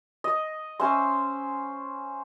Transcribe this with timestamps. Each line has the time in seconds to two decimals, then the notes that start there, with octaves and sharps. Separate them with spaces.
0.24 D#5
0.80 C#4 C5 E5 C6